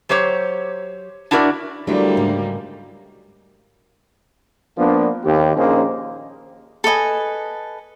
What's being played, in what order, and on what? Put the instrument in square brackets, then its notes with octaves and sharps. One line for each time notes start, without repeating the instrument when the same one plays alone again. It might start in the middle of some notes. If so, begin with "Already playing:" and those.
[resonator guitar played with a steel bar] F#3 G4 C5 C#5
D4 E4 F#4 A#4 B4 D5
[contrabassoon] D2 [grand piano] F#3 G4 D5 [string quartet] G3 A#3 [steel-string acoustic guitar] A3 E4
[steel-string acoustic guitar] G#2 C#3
[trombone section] F3 A#3 B3 D4
D#2 G4
A#1 A#3 C#4 D#4 G#4 C5
[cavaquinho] A4 B4 D#5 G#5